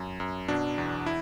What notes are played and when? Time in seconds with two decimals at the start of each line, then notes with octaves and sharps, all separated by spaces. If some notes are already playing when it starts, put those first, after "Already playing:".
Already playing: F#2
0.20 F#2
0.48 B2 D4
0.78 E2
1.06 E4